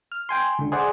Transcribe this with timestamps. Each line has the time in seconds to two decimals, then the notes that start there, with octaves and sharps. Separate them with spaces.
0.12 F6
0.29 G5 G#5 C6
0.59 C#2 D3
0.72 G#4 C5 D5 F#5